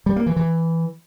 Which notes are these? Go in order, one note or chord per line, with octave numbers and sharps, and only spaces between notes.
G3
A#3
E3
E3